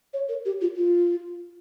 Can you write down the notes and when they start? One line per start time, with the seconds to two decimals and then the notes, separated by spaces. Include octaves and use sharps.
0.14 C#5
0.29 A#4
0.45 G4
0.61 F4
0.76 F4